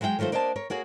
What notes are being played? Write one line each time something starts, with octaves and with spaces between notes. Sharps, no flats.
F#3 G#3 G#4 F5 G5
D#3 F#3 A3 F4 C5
A#3 D4 C5 D#5 F5 A5
A#4 C#5
A#3 F#4 G#4 C#5